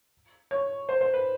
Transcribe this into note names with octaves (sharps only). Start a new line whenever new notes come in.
C#5
C5
C5
B4